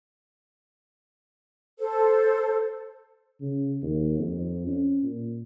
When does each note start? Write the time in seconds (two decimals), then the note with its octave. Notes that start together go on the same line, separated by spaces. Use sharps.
1.79 A4 C5
3.41 C#3
3.82 D#2
4.18 F2
4.67 C#4
5.03 A#2